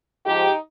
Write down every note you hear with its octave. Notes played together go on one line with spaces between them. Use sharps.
G#2 F3 G#3 D#4 G4